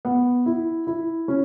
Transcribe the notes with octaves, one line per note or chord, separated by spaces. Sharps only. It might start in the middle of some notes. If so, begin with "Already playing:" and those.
B3
E4
E4
C#4